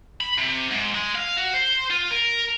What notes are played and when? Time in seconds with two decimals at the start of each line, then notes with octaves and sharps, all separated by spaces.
0.21 B5
0.38 C3
0.71 G#2
0.94 G#3
1.15 F5
1.37 F#4
1.54 C5
1.90 F4
2.11 A#4